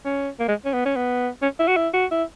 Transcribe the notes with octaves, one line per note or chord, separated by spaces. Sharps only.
C#4
A#3
G#3
C#4
B3
C#4
B3
C#4
E4
F#4
E4
F#4
E4